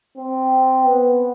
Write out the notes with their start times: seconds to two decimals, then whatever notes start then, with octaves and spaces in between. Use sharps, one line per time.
0.18 C4
0.86 B3